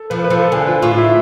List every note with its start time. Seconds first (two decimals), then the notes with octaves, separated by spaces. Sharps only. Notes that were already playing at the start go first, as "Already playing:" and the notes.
Already playing: A4
0.10 F3 B4
0.24 B4
0.30 F3 A4
0.42 A4
0.52 D3 G#4
0.67 F4
0.82 A2 F4
0.98 E4